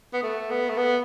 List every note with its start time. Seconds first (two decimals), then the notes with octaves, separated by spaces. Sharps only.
0.14 B3
0.23 A3
0.51 B3
0.69 A3
0.78 B3